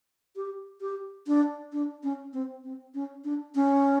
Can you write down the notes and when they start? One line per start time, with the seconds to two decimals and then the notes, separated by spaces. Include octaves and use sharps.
0.36 G4
0.81 G4
1.27 D4
1.73 D4
2.03 C#4
2.33 C4
2.64 C4
2.94 C#4
3.24 D4
3.55 C#4